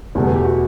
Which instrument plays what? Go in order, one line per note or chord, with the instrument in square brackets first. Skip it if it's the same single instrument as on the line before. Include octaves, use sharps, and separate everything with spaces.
[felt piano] E2 B2 A3 [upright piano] G3
[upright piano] B3
G4
F#4